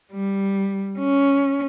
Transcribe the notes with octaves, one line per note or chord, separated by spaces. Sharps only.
G3
C#4